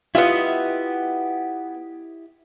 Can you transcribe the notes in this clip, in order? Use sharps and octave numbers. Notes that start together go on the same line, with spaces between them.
B3 E4 F4 G4 D#5 E5